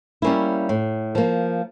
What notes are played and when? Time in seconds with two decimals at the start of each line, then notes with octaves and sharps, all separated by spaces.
0.22 G3 A#3 C#4 E4
0.69 A2
1.15 F3 A#3